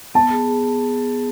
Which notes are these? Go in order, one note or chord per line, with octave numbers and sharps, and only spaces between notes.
B3 A5
G#4
G#4